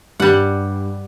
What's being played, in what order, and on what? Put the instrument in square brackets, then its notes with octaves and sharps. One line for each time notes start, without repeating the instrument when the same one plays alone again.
[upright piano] G2 [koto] G3 F#5